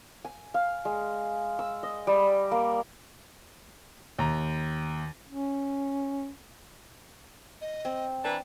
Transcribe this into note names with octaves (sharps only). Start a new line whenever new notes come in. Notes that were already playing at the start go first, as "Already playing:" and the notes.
G#5
F5
G#3
E6
D#5
G3
A#3
D#2 A#5
C#4
D#5
C4
E3 D4 B4 A#5